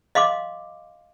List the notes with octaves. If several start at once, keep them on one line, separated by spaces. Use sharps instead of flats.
D#5 F5 C6 D6